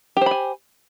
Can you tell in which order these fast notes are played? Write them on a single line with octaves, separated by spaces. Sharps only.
G4 C5 B5 G#5